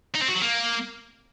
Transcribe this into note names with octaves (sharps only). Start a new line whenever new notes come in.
D#4
C4
F#4
F#3
A#3